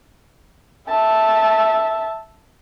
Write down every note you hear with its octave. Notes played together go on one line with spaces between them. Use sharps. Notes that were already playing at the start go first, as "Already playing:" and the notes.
E5 A5